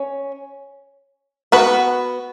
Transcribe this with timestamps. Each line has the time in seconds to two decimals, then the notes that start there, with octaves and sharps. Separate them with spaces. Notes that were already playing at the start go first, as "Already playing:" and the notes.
Already playing: C#4
1.52 B3 F#4 B4